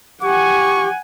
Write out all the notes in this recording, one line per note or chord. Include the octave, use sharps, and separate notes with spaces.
G4 F#5 G#5 C#6